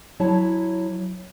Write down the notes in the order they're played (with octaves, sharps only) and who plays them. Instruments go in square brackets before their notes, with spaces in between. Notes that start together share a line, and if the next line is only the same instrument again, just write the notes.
[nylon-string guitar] F#3 E4 C#5 A5